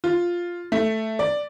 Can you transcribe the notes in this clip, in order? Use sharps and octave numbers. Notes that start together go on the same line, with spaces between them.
F4
A3
D5